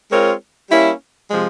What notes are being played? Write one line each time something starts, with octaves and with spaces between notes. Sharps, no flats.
G#3 C4 F4 A#4 C#5
G3 A#3 C#4 E4
C3 F3 G#3